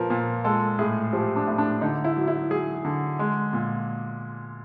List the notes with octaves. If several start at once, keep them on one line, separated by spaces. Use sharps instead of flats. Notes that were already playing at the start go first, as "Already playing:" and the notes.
Already playing: A#2 F3 A#4 B4
A#2
G#3 A4
A2 G#4
F3 G4
D4
A2
D4
D3 D#4
E4
F#3
E4
F#3 G#4
D3
G#3
A#2